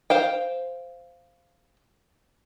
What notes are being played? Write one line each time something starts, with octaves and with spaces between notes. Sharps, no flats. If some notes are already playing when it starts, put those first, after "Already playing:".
C5 F5 G5